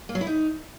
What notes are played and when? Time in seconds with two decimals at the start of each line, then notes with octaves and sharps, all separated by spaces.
0.09 A#3
0.15 F#3
0.21 E4
0.27 D#4